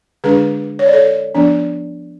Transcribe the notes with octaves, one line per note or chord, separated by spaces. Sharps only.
D3 G#3 D4 G#4 B4
C#5
D5
A4 C#5
F3 B3 D4